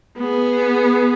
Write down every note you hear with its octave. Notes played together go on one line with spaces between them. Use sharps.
B3 G#4